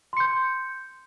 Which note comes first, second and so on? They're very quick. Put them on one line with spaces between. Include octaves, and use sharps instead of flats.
C6 C#7 G6